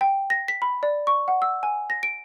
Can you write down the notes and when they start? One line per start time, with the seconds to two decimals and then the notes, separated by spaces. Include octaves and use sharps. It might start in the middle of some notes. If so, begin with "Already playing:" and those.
0.01 G5
0.30 A#6
0.48 B6
0.62 B5
0.83 D5
1.07 C#6
1.28 F#5
1.42 E6
1.63 G#5
1.90 A#6
2.03 D7